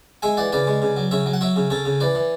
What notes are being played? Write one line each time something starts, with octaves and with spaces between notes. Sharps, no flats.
G#3 E5 G#5
E3 D5 F#5
C#3 B4 D5
G#3
C#3
F#3
C#3 C#5 E5
F#3
F#5
F#3 C#5 E5
C#3
C#3 A4 C#5
C#3
E3 B4 D5
E3